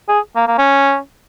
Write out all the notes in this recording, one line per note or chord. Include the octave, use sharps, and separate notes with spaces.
G#4
A#3
A#3
C#4